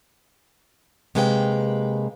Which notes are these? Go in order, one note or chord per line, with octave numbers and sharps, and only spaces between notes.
C3 G#3 A#3 B4 C5 G5